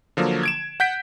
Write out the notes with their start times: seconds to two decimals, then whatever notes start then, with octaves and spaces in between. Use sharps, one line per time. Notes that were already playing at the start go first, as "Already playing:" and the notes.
0.17 D3 F3 F#3 A#3
0.43 G#6 D7 E7
0.80 F#5 G6 B6 D7